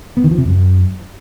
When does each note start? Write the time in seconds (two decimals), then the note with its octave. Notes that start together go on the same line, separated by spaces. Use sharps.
0.17 B3
0.24 D#3
0.31 F3
0.38 C3
0.45 F#2